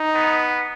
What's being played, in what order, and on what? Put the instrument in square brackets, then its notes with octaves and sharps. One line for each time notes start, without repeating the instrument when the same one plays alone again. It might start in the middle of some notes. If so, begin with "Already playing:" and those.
Already playing: [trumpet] D#4
[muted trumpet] B3